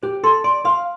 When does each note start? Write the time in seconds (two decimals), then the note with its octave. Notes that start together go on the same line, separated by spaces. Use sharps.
0.03 G4 C5
0.24 A4 C6
0.44 D5 C6
0.65 F5 C6